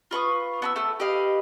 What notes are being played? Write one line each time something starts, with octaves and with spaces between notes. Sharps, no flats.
F4 B4 C#6 D#6
B3 A5 E6
A3 E6
G4 B4 D#5 F5